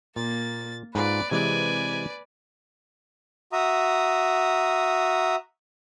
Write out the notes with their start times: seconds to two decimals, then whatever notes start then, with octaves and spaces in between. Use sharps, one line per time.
0.16 A#2 A#3 A6
0.95 G#2 F4 B4 D5
1.31 C3 E3 G#3 B4 D5 G#5
3.53 F#4 E5 A#5 D#6